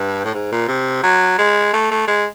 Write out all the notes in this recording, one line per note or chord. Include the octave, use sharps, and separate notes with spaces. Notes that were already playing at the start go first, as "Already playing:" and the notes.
Already playing: G2
A2
G#2
A#2
C3
F#3
G#3
A3
A3
G#3